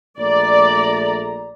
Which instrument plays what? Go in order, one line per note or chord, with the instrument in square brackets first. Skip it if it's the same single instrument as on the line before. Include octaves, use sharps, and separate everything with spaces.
[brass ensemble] A#1 A3 A#5 [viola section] D5